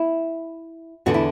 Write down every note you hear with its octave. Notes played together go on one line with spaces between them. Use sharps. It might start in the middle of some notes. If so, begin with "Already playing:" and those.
Already playing: E4
E2 D3 F#4
E4